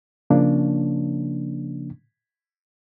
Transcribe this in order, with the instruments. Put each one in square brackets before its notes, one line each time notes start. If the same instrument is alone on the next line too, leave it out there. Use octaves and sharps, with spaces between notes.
[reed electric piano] C#3 F3 A#3 C#4 D4